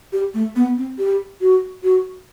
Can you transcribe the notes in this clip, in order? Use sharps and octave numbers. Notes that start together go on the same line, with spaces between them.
G4
A3
B3
C4
G4
F#4
F#4